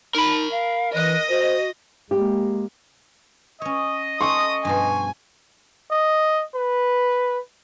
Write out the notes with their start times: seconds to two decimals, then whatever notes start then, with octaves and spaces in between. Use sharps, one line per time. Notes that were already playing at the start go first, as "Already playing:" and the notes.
0.15 D#4 A#4 B5
0.51 F5
0.95 E3 D#5 F#6
1.29 F#4 C5
2.11 G#3 A#3 G4
3.62 C#4 C#5 D#5
4.21 A3 C#4 C6 C#6 D#6
4.65 G2 B2 F3 G#5
5.91 D#5
6.55 B4